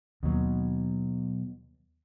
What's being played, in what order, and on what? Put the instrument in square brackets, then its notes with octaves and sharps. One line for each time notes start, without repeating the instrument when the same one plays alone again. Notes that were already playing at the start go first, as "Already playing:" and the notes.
[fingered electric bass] D#2 [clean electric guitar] B2 F#3